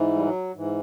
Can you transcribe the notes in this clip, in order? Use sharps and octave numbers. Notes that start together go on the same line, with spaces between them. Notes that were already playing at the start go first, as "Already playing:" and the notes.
Already playing: G#2 E3
G3
F#3
G#2 E3